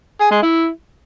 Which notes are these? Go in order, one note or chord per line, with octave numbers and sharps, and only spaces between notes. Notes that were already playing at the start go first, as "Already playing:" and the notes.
G#4
G#3
E4